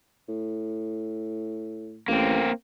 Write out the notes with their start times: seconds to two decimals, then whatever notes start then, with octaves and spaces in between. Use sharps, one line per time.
0.28 A2
2.08 A1 A#3 C4